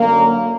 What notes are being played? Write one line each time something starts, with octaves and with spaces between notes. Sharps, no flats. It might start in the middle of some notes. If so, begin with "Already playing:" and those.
Already playing: F#2 D3 F#3 A#3